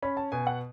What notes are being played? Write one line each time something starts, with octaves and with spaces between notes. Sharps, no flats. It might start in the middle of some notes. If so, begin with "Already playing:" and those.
C#4 B5
A5
B2 G#5
F#5